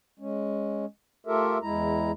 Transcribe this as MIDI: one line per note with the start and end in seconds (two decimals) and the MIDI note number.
0.20 0.86 56
0.20 0.86 61
1.27 1.58 57
1.27 1.58 65
1.27 1.58 67
1.27 1.58 69
1.27 1.58 70
1.27 1.58 76
1.63 2.12 40
1.63 2.12 56
1.63 2.12 64
1.63 2.12 82